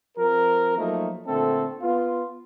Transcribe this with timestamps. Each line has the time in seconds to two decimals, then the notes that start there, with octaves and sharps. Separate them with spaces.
0.18 F3 C4 A#4
0.78 F3 F#3 A3 A#3 D#4
1.27 A#2 D3 A3 C4 A4
1.81 B3 F4